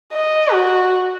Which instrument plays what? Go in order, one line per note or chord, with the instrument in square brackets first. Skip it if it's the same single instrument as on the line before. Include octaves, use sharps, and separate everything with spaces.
[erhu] D#5
F#4